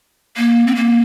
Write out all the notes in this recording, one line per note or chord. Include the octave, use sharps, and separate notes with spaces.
A#3
C4
A#3